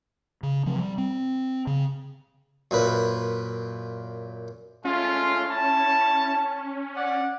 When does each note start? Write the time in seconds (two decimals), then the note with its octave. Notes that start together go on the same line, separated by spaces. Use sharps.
0.43 C#3
0.66 C3 F3 C4
0.79 G3
0.98 C4
1.67 C#3
2.71 F#2 A#2 B4
4.85 G#3 A3 C#4 F4
5.50 E4 C#5 A5
6.96 D5 F#5